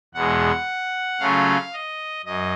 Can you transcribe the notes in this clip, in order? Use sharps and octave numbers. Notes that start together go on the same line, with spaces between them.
E2 B2 G#3 F#5
C#3 F#3 A3 C#4 F4 F5
D#5
F#2 D#5